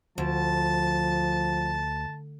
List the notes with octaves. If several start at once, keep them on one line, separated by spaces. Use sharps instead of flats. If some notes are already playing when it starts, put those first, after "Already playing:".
D2 F3 A5